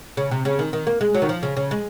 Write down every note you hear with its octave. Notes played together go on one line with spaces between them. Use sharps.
C#3
C3
C#3
D#3
D#3
A#3
G#3
F#3
D#3
F3
C#3
C#3
G#3